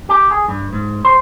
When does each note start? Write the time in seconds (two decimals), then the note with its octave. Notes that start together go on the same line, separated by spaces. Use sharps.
0.09 G4
0.31 G#4
0.48 G2
0.73 G#2
1.05 C5